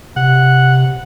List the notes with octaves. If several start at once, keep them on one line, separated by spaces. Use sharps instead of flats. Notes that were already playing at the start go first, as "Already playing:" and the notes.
C3 F#5